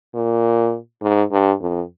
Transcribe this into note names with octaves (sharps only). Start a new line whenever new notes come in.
A#2
G#2
G2
F2